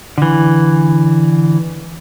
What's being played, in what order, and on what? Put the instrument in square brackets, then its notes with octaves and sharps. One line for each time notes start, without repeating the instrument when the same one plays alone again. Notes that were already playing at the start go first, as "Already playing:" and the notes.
[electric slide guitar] D3 E3